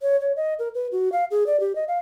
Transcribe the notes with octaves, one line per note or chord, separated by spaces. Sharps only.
C#5
C#5
D#5
A#4
B4
F#4
F5
G#4
D5
G4
D#5
F5